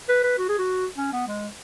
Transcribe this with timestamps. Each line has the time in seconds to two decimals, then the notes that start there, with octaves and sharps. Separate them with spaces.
0.09 B4
0.24 B4
0.38 F#4
0.49 G#4
0.58 F#4
0.97 C#4
1.13 B3
1.27 G#3